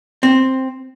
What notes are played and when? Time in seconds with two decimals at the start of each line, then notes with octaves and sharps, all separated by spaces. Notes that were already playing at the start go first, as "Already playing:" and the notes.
0.23 C4